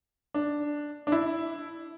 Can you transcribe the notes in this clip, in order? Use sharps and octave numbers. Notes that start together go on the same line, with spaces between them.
D4
D4
E4